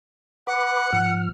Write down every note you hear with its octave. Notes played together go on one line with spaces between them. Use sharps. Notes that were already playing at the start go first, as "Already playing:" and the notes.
B4 F#5 B5 D6
G#2 F3 F6